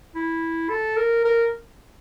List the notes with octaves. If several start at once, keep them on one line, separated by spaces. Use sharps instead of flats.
E4
A4
A#4
A#4